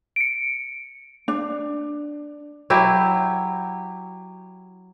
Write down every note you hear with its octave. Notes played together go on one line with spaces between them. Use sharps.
C#7 D7
D4
F#3 E4 G4